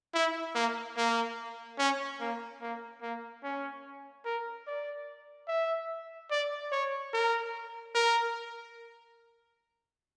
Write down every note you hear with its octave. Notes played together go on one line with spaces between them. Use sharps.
E4
A#3
A#3
C#4
A#3
A#3
A#3
C#4
A#4
D5
E5
D5
C#5
A#4
A#4